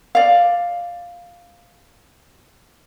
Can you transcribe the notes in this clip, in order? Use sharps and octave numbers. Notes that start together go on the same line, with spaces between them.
D5 F5